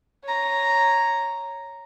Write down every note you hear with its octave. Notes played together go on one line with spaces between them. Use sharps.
C#5 A#5